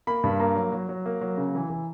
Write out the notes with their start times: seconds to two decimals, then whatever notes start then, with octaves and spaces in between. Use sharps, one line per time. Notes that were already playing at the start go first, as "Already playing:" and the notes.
0.07 A#3 B5
0.24 G2
0.40 A#3 A#5
0.56 F#3
0.72 F#3
0.89 F#3
1.06 A#3
1.21 F#3
1.38 C#3
1.55 E3
1.70 E3